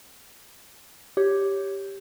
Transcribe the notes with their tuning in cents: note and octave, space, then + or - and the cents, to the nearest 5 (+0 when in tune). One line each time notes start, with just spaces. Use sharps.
G4 +0 C#5 +0